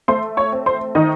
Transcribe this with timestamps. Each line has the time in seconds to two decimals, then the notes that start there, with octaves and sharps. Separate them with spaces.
0.08 A3 C5 C6
0.37 C#5 C#6
0.52 C4
0.66 C5 C6
0.95 D#3 D#4 D#5